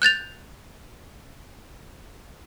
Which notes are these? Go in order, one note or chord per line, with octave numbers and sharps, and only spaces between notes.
F#6 G6 A6 F7